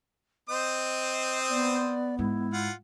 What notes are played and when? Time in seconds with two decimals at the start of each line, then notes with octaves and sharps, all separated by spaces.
0.49 C4 C5 D#5 D#6
1.49 B3 D5
2.19 G#2 E4
2.53 F4 F#5